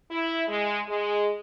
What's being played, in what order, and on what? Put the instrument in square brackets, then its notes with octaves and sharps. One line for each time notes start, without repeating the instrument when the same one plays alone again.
[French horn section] E4
G#3
G#3